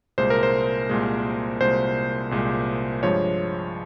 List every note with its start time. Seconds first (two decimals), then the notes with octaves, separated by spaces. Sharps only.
0.18 C2 A#2 G#3 C5
0.30 A#4
0.43 C5
0.89 C2 A#2 G#3
1.60 C2 A#2 G#3 C5
2.31 C2 A#2 G#3
3.03 G2 F3 G#3 C#5